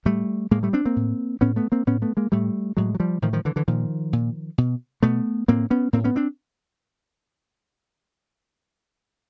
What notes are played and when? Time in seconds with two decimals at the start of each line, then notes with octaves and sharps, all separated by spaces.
0.05 A2 G3 A3
0.51 A2 G#3 A#3
0.63 G3 A3
0.73 C4 D4
0.85 A#3 C4
0.96 A2
1.41 A2 B3 C#4
1.56 A3 B3
1.72 A#3 C4
1.87 A2 B3 C#4
2.02 A3 B3
2.17 G#3 A#3
2.32 A2 G3 A3
2.77 A2 F#3 G#3
2.95 F#3
3.00 F3 G3
3.22 A2 D#3 F3
3.33 D#3 F3
3.45 D3 E3
3.56 D3 E3
3.68 A#2 D#3 F3
4.13 A#2
4.58 B2
5.03 B2 A3 B3
5.48 A2 A#3 C4
5.70 B3 C#4
5.93 A2 A#3 C4
6.04 B3 C#4
6.16 C4 D4